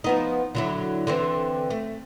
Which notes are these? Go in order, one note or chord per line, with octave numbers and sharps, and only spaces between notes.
F3 B3 D#4
D3 F#3 E4
D3 E3 C4
A3